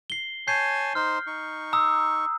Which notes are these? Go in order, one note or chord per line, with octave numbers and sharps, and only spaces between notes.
C7 G7
C#5 G#5 A5 G6 C7
D#4 C5 C6 F6
D#4 C#6
A#5 D#6 E6